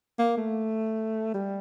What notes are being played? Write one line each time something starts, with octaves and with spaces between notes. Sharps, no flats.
A#3
A3
G3